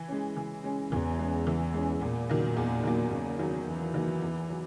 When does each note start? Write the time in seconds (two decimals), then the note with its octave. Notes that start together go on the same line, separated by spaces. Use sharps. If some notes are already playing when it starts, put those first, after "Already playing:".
Already playing: E3
0.09 G#3 C#4
0.36 E3
0.64 G#3 C#4
0.91 E2 E3
1.19 G#3 C#4
1.47 E3
1.74 G#3 C#4
2.01 E2 A#2
2.29 D#3 F#3 A#3
2.57 E2
2.84 D#3 F#3 A#3
3.11 E2 C#3
3.39 D#3 F#3 A#3
3.67 E2 E3
3.94 D#3 F#3 A#3
4.22 E2
4.49 F#3